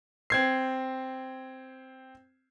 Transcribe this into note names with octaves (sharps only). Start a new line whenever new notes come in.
C4 G#6 C7